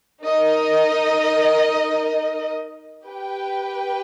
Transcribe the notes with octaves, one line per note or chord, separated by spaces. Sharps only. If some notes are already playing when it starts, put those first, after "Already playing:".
D#4 A#4 D#5
G4 B4 G5